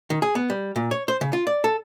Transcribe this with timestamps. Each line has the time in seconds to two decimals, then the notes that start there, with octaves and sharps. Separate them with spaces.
0.10 D#3
0.22 G#4
0.35 B3
0.50 G3
0.76 A#2
0.91 C#5
1.08 C5
1.21 C#3
1.33 F4
1.47 D5
1.64 A4